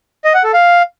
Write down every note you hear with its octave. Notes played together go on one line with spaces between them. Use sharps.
D#5
F#5
A4
F5